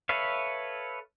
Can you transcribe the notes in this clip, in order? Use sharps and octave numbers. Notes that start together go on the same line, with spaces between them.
A4 B4 C#5 E5 F5